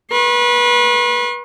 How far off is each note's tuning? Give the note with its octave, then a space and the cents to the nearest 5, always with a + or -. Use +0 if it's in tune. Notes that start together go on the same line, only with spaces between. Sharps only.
B4 -30 C6 +45